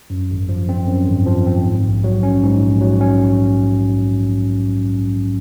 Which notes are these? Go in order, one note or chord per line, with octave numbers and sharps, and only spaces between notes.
F#2
G#1
F3
C4
F#2
G#1
F3
C4
G#2
A#1
F#3
C#4
G#2
A#1
F#3
C#4